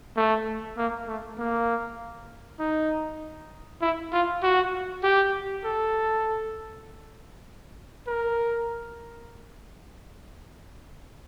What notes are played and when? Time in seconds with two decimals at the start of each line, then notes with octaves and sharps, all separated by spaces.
0.17 A3
0.78 A#3
1.08 A3
1.38 A#3
2.60 D#4
3.82 E4
4.12 F4
4.43 F#4
5.04 G4
5.65 A4
8.08 A#4